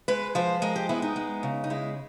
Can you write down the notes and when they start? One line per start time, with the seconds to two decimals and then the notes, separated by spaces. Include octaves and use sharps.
0.08 G#3 B4
0.35 F3 C5
0.62 G#3 A#4
0.76 G4
0.89 B3 E4
1.02 D#4
1.16 G#3
1.43 C#3
1.64 D#4
1.70 G#3 E4